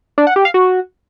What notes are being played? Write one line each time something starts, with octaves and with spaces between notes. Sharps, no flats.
D4
F#5
G4
F5
F#4